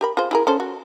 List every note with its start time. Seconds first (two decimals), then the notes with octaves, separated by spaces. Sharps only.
0.01 G4 A#4 B5
0.17 F4 G#4 C5
0.31 E4 G#4 A#4
0.47 C#4 A4 C5
0.60 F#4